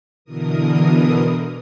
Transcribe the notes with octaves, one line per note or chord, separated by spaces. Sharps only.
B2 D3 E3 A#4 D#6